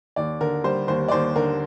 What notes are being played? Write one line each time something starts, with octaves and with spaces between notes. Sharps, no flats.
D#2 D5
D3 A#4
G3 C5
D#2 C5
D5
D#2 C5
D3 A#4